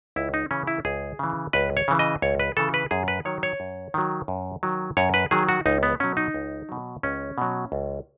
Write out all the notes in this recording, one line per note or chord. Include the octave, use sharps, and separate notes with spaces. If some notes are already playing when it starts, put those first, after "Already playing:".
C#2 E4
D#4
C#3 E3 C#4
E4
C#2 G#4
C#3 E3
C#2 B4
C#5
C#3 E3
D#5
C#2 C#5
B4
C#3 E3 A4
B4
F#2 G#4
B4
D#3 F#3 C#5
C#5
F#2
D#3 F#3
F#2
D#3 F#3
F#2 C#5
B4
D#3 F#3 G#4
F#4
C#2 D#4
B3
B2 F#3 C#4
D#4
C#2
B2 F#3
C#2 C#4
B2 F#3
C#2